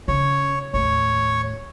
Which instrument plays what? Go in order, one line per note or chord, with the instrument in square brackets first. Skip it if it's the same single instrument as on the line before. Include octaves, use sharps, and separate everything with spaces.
[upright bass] C#3 [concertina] C#5
[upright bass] D#2 A2 [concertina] C#5